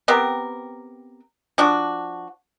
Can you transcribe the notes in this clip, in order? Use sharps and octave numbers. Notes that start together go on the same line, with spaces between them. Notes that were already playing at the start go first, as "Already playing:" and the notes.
B3 C4 G4 A#4
F3 D4 F#4